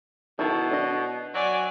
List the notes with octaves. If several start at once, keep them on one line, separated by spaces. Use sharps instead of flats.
B2 D#3 E4 A4
D4 D#5
F#3 D5 G#5